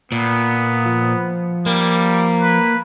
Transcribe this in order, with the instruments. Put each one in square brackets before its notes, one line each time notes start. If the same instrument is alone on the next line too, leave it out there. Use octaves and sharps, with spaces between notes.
[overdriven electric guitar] A#2 [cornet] B3
[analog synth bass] F3
[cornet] G3 [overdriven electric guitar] A#3
[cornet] B4